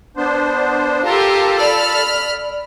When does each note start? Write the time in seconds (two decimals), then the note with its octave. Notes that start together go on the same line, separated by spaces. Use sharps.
0.17 B3 D4 C5
1.05 F4 G4 A4 A#4 A5
1.60 D5 B5 F6